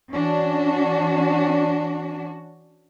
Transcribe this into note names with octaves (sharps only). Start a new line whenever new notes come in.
E3 C#4 D4 F#4